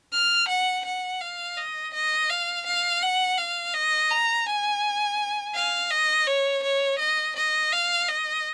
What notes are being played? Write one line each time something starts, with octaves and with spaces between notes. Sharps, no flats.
F6
F#5
F#5
F5
D#5
D#5
F5
F5
F#5
F5
D#5
A#5
G#5
F5
D#5
C#5
C#5
D#5
D#5
F5
D#5